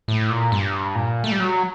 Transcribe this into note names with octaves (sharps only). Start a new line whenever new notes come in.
A2
A#2
G2
A#2
A3
G3
F#3